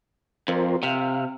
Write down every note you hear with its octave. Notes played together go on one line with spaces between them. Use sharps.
F2 F4 A#4 C5
C3 F5